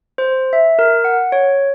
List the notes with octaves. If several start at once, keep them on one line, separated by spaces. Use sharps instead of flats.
C5
E5
A#4
F#5
C#5